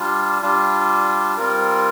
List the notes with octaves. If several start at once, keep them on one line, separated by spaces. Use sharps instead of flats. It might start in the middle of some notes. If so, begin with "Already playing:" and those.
Already playing: G3 D4 F4
G3 D4 F4
G3 C4 F4 A#4